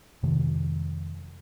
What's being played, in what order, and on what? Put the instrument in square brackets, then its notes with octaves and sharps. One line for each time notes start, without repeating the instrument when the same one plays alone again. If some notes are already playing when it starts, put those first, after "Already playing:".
[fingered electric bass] F2 C3 D#3 G#3